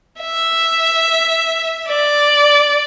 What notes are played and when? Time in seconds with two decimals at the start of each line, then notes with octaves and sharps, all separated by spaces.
0.21 E5
1.88 D5